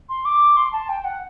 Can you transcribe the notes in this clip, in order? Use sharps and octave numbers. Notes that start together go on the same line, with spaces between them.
C6
D6
C6
A5
G5
F#5